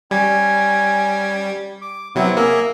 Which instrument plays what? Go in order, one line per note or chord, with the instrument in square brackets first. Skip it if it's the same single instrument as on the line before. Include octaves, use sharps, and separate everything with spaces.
[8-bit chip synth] G3 [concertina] C#4 G#5
[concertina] D6
[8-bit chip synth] C3 F#3 [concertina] B3 C4 E4
[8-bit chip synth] A#3 [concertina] G#4 A#4 E5